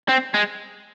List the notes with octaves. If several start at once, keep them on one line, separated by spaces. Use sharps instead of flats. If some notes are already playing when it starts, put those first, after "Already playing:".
C4
G#3